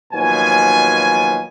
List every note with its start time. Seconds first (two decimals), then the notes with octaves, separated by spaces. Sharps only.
0.14 D#2 B2 F3 F#3 G#5